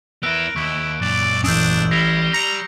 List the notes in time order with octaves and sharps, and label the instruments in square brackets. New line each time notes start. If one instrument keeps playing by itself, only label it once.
[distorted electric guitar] B3 E4 [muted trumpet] A#4 [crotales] E6 F#6 D7
[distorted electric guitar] D#2 [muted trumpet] E4 [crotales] C#6
[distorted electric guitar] F#2 A#2 [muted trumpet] D5
[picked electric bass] E3 C#4 [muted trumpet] D4 [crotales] D#6 E6 G6
[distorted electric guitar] G3 [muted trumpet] E4 [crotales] A#6 C7
[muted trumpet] A#5 [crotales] A#6 C#7 F7